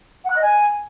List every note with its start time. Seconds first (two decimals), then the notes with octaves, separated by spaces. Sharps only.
0.24 F#5
0.30 F#6
0.36 D#5
0.42 G#5